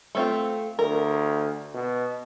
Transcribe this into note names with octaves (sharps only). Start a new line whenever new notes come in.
A3 C4 F4
D2 A#4
B2